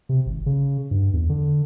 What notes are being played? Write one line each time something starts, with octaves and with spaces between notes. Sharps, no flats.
C3
G#1
C#3
G2
E2
D3